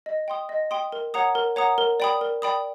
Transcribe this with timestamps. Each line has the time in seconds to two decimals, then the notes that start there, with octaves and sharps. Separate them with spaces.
0.06 D#5
0.28 G5 C6 D#6
0.49 D#5
0.71 G5 C6 D#6
0.92 A#4
1.14 C#5 F#5 A#5 D#6
1.35 A#4
1.56 C#5 F#5 A#5 D#6
1.78 A#4
2.00 D5 G5 B5 D#6
2.21 A#4
2.42 D5 G5 B5 D#6